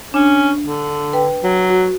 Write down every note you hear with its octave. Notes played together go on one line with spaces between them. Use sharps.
C#4 D4
D3
B4 G5
F#3
F#4